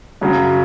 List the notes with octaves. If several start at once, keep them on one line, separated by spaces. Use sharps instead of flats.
F#2 C#3 F#3